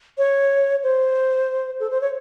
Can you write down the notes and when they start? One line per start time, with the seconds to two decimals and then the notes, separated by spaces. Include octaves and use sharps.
0.18 C#5
0.83 C5
1.80 A4
1.91 C5
2.01 C#5